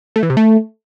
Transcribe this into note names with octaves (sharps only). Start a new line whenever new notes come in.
A3
E3
C3
A3